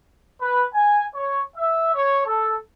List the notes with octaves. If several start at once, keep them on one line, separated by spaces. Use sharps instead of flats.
B4
G#5
C#5
E5
C#5
A4